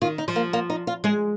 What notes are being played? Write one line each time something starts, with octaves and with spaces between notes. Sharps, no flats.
D#3 F4
D#4
F3
A#3
A#3
D#4
F4
G#3 G#4